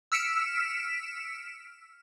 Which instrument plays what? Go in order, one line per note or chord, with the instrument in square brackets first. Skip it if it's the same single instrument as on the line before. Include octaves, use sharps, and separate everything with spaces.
[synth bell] E6 F6 B6 C#7 D7 E7